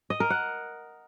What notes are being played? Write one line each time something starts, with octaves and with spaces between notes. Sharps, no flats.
D#5
A#4
F#5